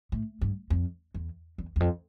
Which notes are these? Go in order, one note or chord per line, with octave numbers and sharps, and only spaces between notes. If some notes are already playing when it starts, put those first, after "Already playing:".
A2
G2
F2
E2
E2
E2
F2